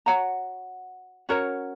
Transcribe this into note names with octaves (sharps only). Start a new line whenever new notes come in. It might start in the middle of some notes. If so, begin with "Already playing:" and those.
F#4 C#5 F#5 A#5
C#4 F#4 A#4 C#5